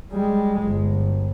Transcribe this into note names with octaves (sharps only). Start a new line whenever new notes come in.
G3 G#3
G1